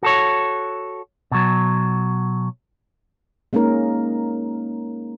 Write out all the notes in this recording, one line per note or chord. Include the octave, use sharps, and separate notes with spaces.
F#4 A4 C#5
B2 F#3
G#3 A#3 C#4 D#4 A#4